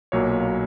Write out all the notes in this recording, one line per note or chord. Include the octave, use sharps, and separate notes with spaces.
B1 A#2 F#3 A#3 C#5